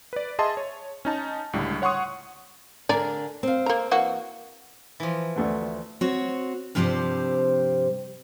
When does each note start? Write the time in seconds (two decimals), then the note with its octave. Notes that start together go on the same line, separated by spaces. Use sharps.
0.13 B4 D5
0.39 G#4 D#5 E5 A5 C6
0.57 C#5
1.05 C#4 D#4 A5
1.53 C#2 A2 D3 G3
1.82 C#5 F#5 C6 C#6 D#6
2.89 D3 G#4 A#4 D5 G#5 A#5
3.43 C4 F5
3.66 A#3 A#5
3.91 E3 A#3 F#4
5.00 E3 F3
5.36 D2 A3 B3
6.01 C4 F#4 C#5
6.75 G2 C3 F3 C4 G4 C5